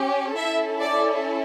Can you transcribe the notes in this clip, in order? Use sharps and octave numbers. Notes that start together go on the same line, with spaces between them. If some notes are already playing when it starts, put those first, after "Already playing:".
Already playing: C#4 G4
C#4 E4 A4 E5
D5